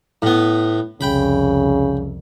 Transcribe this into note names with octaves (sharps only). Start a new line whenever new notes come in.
A2 B3
C2 F2 C#3 G5 B5